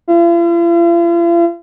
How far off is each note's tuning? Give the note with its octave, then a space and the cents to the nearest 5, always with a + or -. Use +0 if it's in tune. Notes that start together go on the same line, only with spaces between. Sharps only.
F4 -45